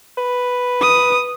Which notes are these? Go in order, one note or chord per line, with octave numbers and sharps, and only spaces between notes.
B4
D#6